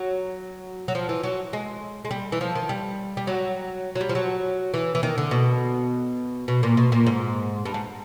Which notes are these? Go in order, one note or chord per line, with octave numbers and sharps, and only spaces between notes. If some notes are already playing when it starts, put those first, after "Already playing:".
Already playing: F#3
F#3
F3
E3
F#3
G#3
G#3
G3
E3
F3
D#3
G3
G3
F#3
F#3
G3
F3
F#3
E3
E3
D#3
D3
B2
B2
A#2
B2
A#2
G#2
G2
G#2